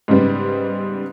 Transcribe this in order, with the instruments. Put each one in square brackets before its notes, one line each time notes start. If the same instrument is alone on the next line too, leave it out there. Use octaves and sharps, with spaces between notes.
[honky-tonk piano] G#2 C#3 G3 B3